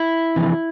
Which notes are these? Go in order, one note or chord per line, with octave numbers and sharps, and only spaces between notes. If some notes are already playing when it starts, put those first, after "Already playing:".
Already playing: E4
F2 C3 E3